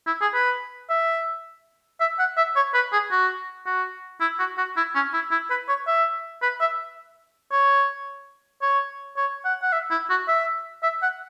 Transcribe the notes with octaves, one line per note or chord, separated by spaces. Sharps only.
E4
G#4
B4
E5
E5
F#5
E5
C#5
B4
G#4
F#4
F#4
E4
F#4
F#4
E4
C#4
E4
E4
B4
C#5
E5
B4
E5
C#5
C#5
C#5
F#5
F#5
E5
E4
F#4
E5
E5
F#5